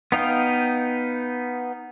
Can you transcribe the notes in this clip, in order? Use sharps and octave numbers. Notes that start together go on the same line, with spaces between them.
B3 D#4 F5 G5